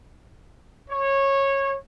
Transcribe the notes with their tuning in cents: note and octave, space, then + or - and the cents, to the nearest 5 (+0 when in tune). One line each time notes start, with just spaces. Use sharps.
C#5 -15